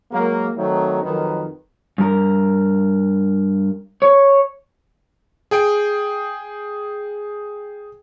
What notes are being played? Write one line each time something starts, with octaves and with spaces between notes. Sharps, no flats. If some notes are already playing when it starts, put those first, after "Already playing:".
F#3 G#3 A#3
D#3 F#3 A3 C4 D#4
F2 D#3 F#3 A#4 B4
G2 A#4
C#5
G#4 G5 D7